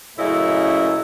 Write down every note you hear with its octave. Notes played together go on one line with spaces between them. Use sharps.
F#2 A#2 C#3 A3 E4 D#5